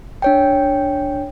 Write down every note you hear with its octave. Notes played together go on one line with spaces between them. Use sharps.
D4 C#5 G5